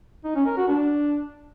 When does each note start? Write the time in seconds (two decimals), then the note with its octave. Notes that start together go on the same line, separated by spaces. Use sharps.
0.25 D#4
0.35 C#4
0.46 A#4
0.57 F#4
0.68 D4